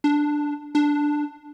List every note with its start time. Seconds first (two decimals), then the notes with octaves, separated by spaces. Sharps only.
0.04 D4
0.75 D4